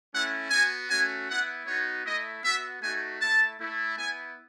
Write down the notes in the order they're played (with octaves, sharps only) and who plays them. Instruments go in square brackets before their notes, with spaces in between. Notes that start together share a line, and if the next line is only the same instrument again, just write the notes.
[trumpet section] A3 C#4 E4 F#5
B3 F#4 G#5
A3 C#4 F#4 G#5
B3 E4 F#5
B3 D#4 F#4 C#5
A3 E4 D#5
B3 F#4 E5
A3 D#4 F#4 G#5
A3 E4 A5
A3 E4
B3 E4 G#5